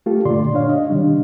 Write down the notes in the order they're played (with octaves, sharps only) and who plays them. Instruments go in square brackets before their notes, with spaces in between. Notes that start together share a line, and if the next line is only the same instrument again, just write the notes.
[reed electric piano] A3 F4 G4 A4
G2 A#2 D3 D5 C6
D4 C#5 F5
D#5
C3 D#3 G3 D4